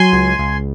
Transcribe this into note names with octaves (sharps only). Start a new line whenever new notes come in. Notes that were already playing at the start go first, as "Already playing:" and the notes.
Already playing: F#3 G#5 C6
C#2
C#2